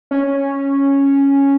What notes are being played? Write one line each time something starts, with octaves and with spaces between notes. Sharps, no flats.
C#4